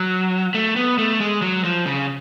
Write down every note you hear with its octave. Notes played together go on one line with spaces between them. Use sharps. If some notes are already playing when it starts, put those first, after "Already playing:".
Already playing: F#3
A3
B3
A3
G#3
F#3
F3
C#3